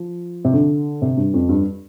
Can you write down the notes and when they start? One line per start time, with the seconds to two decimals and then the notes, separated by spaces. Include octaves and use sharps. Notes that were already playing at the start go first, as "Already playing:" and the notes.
Already playing: F3
0.45 C3
0.54 D3
1.02 C3
1.17 G2
1.34 F2
1.49 G2